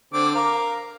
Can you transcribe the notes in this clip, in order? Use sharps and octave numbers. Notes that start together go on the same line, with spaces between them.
D3 C4 D6
A#4 F5 A#5